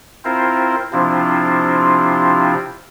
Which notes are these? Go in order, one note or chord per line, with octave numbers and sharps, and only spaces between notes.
C4 E4 F4 A#4 C5
C3 F3 C4 D4 E4 F4